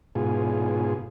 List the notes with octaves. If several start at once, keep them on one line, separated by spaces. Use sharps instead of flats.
G#2 B2 F4 G#4